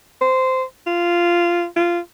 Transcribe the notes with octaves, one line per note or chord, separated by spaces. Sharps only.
C5
F4
F4